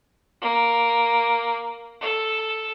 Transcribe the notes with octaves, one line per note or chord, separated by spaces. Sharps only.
A#3
A4